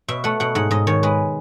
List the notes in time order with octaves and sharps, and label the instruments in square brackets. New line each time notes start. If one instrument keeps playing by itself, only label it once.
[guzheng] B2 E5
A3 F#5
B2 F#5
G#2 F#5
G#2 D#5
D#3 C#5
G#3 B4